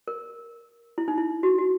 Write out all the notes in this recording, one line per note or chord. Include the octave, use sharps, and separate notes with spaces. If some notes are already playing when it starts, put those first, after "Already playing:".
A#4
E4
D#4
E4
F#4
F#4